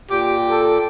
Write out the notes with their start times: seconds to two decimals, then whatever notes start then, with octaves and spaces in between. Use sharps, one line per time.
0.10 A#2 G4 G5 D6
0.51 A4